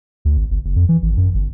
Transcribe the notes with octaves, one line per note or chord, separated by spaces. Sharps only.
D2
G#1
G1
F#1
F2
E3
G#1
F#2
G1